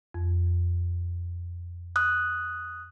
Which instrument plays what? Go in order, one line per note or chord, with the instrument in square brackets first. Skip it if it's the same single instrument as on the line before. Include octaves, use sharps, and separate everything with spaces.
[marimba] F2
[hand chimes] D#6 F#6